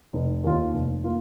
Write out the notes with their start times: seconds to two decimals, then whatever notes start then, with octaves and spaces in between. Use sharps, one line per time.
0.13 F1
0.44 D#2 D#3 A#3 F4
0.74 F1
1.04 A#3 F4